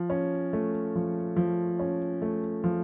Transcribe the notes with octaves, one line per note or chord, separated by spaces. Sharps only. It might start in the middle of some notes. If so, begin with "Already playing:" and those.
Already playing: F3
C#4
A3
F3
F3
C#4
A3
F3